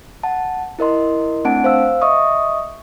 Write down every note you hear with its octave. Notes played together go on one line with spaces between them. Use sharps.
F#5 A5
E4 A#4 D#5 C6
A3 C4 D4 F#5 A5 D7
C5 F5 E6
D#5 E5 C#6 D#6